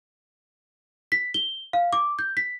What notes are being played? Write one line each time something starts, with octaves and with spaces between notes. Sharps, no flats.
B6
G7
F5
D6
G6
B6